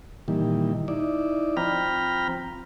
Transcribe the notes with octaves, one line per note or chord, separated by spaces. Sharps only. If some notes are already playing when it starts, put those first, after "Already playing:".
A#2 D#3 E3 G3
D#4 E4 D5
F3 C4 G5 A#5 B5 F6